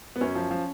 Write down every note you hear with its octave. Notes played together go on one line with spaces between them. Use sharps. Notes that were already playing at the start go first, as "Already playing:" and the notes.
B3
F#2 C#4
F3
F3